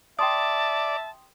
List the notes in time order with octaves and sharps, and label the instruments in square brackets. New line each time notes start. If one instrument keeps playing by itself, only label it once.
[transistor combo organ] D5 [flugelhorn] E5 [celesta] G5 C6 D#6 [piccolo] A5